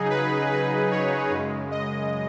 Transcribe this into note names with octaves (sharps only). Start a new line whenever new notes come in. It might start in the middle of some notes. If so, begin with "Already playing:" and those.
Already playing: C#3 F#3 D#4 G#4
B4
B4
C#5
F#2 C#3 G#3
D#5